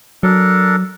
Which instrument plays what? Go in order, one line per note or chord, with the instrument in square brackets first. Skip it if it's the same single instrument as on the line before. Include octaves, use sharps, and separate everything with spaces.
[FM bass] F#3 [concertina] D4 A4 A#4